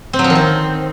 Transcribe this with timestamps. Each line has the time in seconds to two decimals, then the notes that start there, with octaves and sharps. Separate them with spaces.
0.13 C4
0.19 F#3
0.24 F3
0.30 D#3
0.35 C4